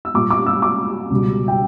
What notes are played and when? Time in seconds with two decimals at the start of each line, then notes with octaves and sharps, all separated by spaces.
0.05 E6
0.14 A#2 G3 D6
0.30 D6
0.46 E6
0.62 D6
1.10 C#2 B2 G3
1.48 G5